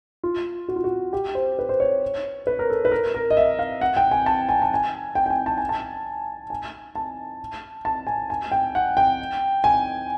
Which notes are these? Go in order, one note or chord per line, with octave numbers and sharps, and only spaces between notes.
F4
F#4
F4
F#4
G4
C5
B4
C5
C#5
B4
A#4
A4
B4
A#4
A#4
D#5
E5
F5
F#5
G5
G#5
A5
G#5
A5
G#5
G5
G5
G#5
A5
G#5
A5
G#5
A5
A5
G#5
G#5
G5
F#5
G5
G#5